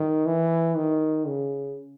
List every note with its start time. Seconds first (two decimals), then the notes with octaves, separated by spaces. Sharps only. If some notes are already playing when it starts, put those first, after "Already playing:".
Already playing: D#3
0.26 E3
0.76 D#3
1.27 C#3